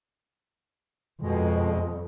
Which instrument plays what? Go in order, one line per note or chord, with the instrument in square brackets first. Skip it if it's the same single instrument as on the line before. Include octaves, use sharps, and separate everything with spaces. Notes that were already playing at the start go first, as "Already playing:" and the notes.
[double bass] F2 [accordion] B2 G#3